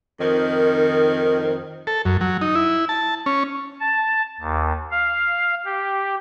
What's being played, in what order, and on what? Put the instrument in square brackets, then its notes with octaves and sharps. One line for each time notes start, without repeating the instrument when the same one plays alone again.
[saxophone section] F2 D#3
[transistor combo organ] A4
F#2
F#3
D#4
E4
A5
C#4
[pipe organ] A5
D#2
F5
G4